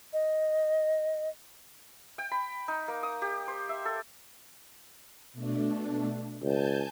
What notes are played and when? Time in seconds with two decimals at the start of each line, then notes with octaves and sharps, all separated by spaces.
0.13 D#5
2.18 G5
2.32 B5
2.68 D#4
2.88 A#3
3.03 D#6
3.22 G4
3.48 C5
3.69 E5
3.85 A4
5.33 B2 A3 D4
6.43 C#2 G#5 A5 G6